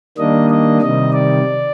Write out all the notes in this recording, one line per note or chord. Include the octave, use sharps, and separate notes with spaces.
D#3 G3 A#3 D4 D#5
D#5
C3 D#3 G3 D#5
D5